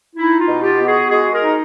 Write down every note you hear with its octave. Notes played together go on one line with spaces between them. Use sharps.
D#4 E4
F4
B2
F4 G4
B3
F#4 G#4
G#3 F#4 G#4
G#4 A#4
D#4